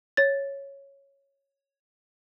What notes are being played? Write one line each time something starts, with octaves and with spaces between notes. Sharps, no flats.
C#5 A6